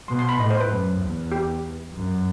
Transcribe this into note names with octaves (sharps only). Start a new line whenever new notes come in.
B2 C6
C6
B5
A2 D#5
C5
B4
F#2
E2
G4
F#2